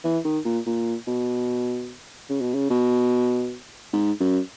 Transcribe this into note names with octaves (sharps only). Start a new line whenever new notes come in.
E3
D#3
A#2
A#2
B2
C#3
B2
C#3
B2
G#2
F#2